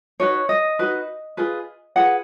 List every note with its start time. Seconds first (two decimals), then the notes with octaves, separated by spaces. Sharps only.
0.20 D#4 F#4 B4 C#5
0.49 D#5
0.79 D#4 F#4 B4
1.37 F4 G#4 B4
1.96 F4 G#4 B4 F#5